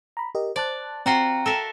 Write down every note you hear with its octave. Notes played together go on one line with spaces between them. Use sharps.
A#5 B5
G4 A#4 D#5
C5 D5 A5 F#6
C4 F4 F#4 F#5 G5 A#5
A4 A#4 E5